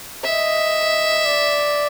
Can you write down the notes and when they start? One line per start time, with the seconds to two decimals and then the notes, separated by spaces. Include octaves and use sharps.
0.24 D#5 E5
1.26 D5